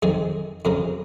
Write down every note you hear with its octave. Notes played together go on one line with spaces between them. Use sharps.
F2 D#3 G#4
F2 C#3 A#4